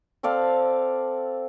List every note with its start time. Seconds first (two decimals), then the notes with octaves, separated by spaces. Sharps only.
0.23 C4 A4 D5 F5